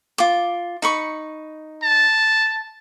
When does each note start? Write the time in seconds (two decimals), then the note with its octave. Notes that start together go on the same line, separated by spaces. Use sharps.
0.18 F4 D6
0.82 D#4 B5 C#6
1.83 A5